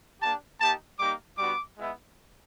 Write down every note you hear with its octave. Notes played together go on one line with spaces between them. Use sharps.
A#3 D4 G4 A5
A#3 D#4 G4 A5
G3 A#3 D#4 G4 D6
G3 B3 D4 F#4 D6
G#3 B3 E4